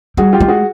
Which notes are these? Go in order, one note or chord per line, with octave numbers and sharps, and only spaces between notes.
G3 F#4 G#4
F4 G4
G#3
F#4 G#4